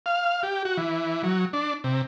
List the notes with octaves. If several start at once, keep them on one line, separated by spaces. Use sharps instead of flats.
F5
G4
F#4
E3
F#3
D4
C3